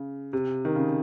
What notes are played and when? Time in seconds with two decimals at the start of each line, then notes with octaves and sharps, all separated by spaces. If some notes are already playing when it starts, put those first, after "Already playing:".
Already playing: C#3
0.33 C3
0.65 D#3
0.75 C#3